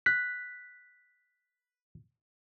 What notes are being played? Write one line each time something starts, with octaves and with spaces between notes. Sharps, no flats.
F#6 B6